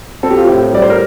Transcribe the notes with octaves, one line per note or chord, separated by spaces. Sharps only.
C4 A4
G4
F4
A2 G4
G3 D5
C5
A#4